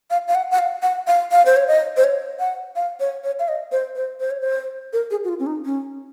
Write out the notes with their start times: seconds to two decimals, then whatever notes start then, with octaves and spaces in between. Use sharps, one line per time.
0.11 F5
0.28 F5
0.35 F#5
0.51 F#5
0.59 F5
0.82 F#5
1.07 F5
1.32 F5
1.46 C5
1.57 C#5
1.68 D#5
1.97 C5
2.04 C#5
2.39 F#5
2.76 F5
3.00 C#5
3.24 C#5
3.39 F5
3.48 D#5
3.72 C5
3.96 C5
4.20 C5
4.31 C#5
4.41 C5
4.93 A#4
5.11 G#4
5.24 F#4
5.29 F4
5.39 C#4
5.46 D#4
5.65 C#4